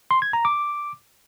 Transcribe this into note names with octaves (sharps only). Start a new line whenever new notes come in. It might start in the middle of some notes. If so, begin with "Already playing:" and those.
C6
G#6
A#5
D6